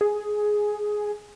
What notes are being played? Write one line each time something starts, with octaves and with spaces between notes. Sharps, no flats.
G#4